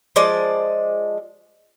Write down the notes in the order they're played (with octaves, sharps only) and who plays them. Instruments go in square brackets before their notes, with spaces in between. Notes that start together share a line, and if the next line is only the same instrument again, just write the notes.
[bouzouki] F3 G#3 D5